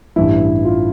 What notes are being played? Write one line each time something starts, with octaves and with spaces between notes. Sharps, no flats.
A1 G2 E3 E4
F4